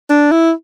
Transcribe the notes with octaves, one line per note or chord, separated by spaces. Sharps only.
D4
E4